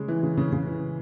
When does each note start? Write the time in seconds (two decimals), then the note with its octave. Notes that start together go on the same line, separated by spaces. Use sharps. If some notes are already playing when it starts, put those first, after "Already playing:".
Already playing: C#3 G#3
0.08 E3
0.23 C#3
0.37 C#3
0.52 C#3
0.67 E3